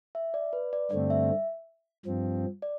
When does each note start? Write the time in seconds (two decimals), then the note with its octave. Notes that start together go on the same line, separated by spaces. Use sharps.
0.15 E5
0.34 D5
0.53 B4
0.73 D5
0.91 G2 D3 A3 C4 D5
1.10 E5
2.06 G2 F3 C4
2.62 D5